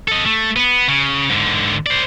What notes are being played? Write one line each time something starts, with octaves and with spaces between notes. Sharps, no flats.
A4 D#5
A3
B3
C#3
G#2 D3
C5 D5